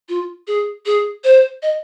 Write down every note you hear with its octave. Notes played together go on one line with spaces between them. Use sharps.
F4
G#4
G#4
C5
D#5